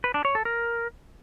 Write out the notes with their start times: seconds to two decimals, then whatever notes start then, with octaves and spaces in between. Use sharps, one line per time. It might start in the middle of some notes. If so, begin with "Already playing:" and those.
0.04 B4
0.14 D4
0.25 C#5
0.35 A4
0.45 A#4